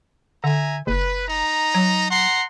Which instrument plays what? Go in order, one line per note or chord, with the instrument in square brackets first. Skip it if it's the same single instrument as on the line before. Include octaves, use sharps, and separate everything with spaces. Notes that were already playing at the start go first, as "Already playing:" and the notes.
[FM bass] D3 [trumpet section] E5 G#5 A#5
[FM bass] F#1 [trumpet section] B4
[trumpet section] D#4 A#5
[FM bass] F#3
[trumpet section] F#5 A#5 C6